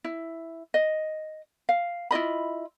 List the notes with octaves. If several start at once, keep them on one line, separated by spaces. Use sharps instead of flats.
E4
D#5
F5
E4 F4 D#5 B5